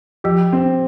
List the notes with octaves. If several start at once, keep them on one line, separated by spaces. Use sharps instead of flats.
F3 G4
C4